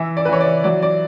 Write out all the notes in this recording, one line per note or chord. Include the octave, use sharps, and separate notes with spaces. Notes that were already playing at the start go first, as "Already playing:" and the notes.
Already playing: E3 E5
D5
B4
E3 C#5
D5
F#3 D5
D5